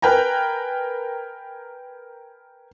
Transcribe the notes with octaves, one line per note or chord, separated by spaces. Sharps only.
A#4 B4 G5 G#5 A#5